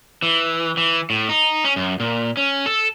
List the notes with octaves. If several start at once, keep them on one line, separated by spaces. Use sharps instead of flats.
E3
E3
A2
D#4
C#4
F#2
A#2
C#4
A4